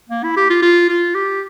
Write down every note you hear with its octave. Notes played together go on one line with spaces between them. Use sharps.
A#3
E4
G4
F4
F4
F4
G4